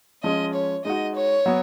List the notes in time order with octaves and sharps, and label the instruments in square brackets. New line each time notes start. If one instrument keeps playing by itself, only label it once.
[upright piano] F3 G#3 C#4 [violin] D#5
[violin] C#5
[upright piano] G#3 D#4 F#4 [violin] D#5
[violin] C#5
[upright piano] F#3 B3